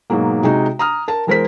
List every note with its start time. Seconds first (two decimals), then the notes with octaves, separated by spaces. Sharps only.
0.10 G#2 B2 F#3 G#3 A#3
0.43 C3 G#3 D#4 F#4
0.79 A#5 D#6 F6
1.08 A#4 A5
1.27 E2 G#3 A#4 C5 B6